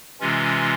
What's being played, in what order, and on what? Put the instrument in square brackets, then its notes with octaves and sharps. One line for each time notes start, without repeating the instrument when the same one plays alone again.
[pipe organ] C3 E3 G#3 C#4 F4